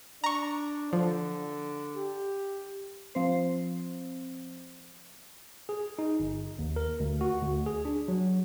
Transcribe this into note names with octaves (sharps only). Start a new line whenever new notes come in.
D4 A#5 C#6
D3 F3
G4
F3 C4 C5
G#4
D#4
G1
D#2
A#4
D2
F#4
D2
G#4
D4
F#3